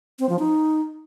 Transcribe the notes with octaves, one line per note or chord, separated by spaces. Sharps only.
C4
F3
D#4